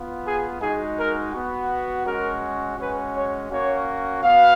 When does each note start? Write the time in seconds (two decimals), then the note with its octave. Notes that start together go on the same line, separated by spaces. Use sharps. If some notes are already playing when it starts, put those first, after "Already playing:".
Already playing: B3 F4
0.25 G#4
0.61 G#3 D#4 F#4 G#4
0.97 A#4
1.33 B3 F#4
2.05 G#3 C#4 F#4 A#4
2.78 G#3 C#4 F#4 B4
3.15 C#5
3.51 A#3 C#4 F#4 C#5
4.23 B3 F#4 F5